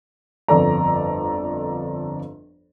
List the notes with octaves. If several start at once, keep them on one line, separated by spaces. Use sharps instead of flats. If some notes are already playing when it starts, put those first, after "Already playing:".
G1 F2 A4 D5 A#5